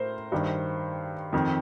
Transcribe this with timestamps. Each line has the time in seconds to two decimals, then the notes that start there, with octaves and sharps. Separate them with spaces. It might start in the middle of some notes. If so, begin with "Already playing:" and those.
Already playing: A2 A#4 C5
0.32 G2 D#3
1.33 F2 D#3